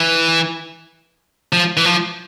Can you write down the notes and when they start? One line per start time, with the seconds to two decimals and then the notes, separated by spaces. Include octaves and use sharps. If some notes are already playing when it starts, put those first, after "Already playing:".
Already playing: E3
1.53 F3
1.77 E3
1.85 F3